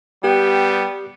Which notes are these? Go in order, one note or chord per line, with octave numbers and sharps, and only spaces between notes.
G3 B3 G4 G5